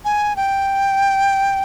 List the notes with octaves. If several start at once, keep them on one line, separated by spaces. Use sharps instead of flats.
G#5
G5